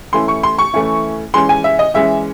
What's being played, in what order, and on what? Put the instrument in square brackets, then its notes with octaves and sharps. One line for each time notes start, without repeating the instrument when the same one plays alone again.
[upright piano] E3 A3 C#4 E4 C6
C#6
C6
C#6
E3 A3 C#4 E4
E3 G#3 C#4 C6
G#5
E5
D#5
E3 G#3 C#4 E5